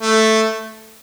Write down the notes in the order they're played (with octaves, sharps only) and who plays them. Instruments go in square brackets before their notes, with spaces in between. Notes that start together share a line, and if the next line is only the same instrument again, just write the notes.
[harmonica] A3